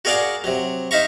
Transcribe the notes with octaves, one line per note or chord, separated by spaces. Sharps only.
F#4 G#4 A#4 D5 F5 F#5
C3 F#3
D#4 E5 F5 A#5 C#6